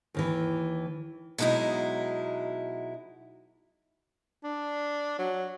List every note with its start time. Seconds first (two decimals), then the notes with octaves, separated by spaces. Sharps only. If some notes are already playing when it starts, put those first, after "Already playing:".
0.15 D#2 D#3 E3
1.38 B2 F#3 G#3 D#4 E4
4.44 D4
5.19 F#3